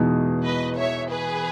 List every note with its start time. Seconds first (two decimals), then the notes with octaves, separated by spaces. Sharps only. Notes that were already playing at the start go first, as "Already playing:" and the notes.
Already playing: E2 B2 G#3 D#4 G#4
0.44 B4 D#5
0.78 C#5 E5
1.11 G#4 B4